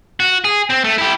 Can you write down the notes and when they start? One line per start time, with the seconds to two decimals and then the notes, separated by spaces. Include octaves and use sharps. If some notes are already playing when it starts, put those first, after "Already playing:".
0.20 F#4
0.44 G#4
0.70 C4
0.84 A3
0.98 E4 G4